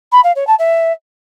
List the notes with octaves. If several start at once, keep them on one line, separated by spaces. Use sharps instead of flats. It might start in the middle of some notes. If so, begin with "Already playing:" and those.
B5
F5
C#5
A5
E5